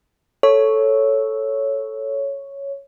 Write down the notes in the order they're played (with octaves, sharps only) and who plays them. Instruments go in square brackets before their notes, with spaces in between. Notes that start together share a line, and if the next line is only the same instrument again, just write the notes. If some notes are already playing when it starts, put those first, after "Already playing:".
[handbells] A4 [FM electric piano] C#5